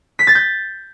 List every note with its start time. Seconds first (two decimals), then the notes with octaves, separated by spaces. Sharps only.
0.19 B6
0.27 A6
0.35 G6